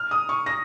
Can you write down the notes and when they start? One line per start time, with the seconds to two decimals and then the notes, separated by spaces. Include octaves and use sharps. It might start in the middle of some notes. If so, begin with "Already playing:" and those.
Already playing: F6
0.11 D#6
0.29 C#6
0.46 A#6